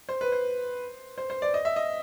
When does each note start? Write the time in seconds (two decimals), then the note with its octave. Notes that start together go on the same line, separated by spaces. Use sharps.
0.09 C5
0.21 B4
0.32 C5
1.18 C5
1.30 C5
1.42 D5
1.54 D#5
1.65 E5
1.76 D#5